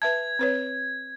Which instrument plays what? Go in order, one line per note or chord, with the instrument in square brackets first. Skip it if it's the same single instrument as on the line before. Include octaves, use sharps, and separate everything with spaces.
[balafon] B4 E5 A5 [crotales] G#6
[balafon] C4 B4 C#5